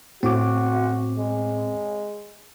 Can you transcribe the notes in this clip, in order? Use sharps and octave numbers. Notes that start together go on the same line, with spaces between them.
A2 C4 F#4 D6
G#3